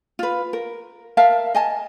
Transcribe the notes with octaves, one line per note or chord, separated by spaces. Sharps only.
F4 B4
A#4
A#4 E5 F5 A5
D#5 G#5 A5